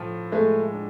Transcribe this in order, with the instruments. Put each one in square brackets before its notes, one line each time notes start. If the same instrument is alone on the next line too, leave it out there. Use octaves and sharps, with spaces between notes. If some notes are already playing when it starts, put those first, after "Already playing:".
Already playing: [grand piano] A2 F3
[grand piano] G#3 [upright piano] A3
[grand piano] D4